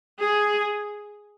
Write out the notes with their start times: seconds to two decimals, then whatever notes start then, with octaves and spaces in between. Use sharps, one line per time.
0.19 G#4